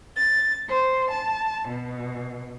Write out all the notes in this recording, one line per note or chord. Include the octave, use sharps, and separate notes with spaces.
A6
C5
A5
B2